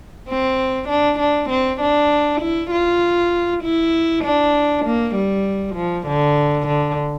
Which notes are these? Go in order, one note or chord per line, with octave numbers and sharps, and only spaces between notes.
C4
D4
D4
C4
D4
E4
F4
E4
D4
A#3
G3
F3
D3
D3